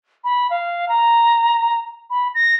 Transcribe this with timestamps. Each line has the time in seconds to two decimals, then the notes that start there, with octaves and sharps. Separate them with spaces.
0.24 B5
0.50 F5
0.89 A#5
2.10 B5
2.34 A#6